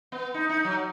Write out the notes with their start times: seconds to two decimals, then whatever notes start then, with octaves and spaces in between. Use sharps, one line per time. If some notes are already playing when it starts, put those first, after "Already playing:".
0.12 B3
0.34 D#4
0.49 D#4
0.65 F#3